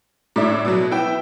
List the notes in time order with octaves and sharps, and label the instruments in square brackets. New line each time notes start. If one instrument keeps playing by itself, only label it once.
[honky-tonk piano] A2 D4 E5
B2 F#3
B3 E4 G5